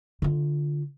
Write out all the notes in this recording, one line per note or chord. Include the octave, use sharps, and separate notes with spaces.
D3 F4